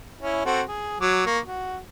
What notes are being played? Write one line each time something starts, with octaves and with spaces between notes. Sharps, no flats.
C#4 E4
C4 F#4 A4
G#4
F#3 D6
A#3 C#6
F#4